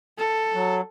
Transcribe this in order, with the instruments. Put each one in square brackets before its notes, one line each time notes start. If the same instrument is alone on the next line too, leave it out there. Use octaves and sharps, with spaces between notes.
[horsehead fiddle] A4
[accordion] F#3